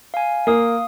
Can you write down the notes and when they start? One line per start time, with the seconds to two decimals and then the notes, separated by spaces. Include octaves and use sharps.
0.14 F5 G#5
0.47 A#3 F5 D#6